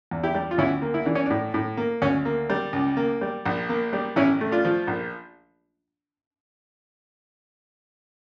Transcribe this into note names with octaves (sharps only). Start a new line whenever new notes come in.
E2
E4 G4
G3
F4
D2 C#4 E4
A#3
E4
E3 D4
C#4
A2 D4
A2
A#3
D2 C#4
A#3
G3
C#2
A#3
G3
A#1
A#3
G3
A1 C#4 E4
A3
D4 F4
F3
A#1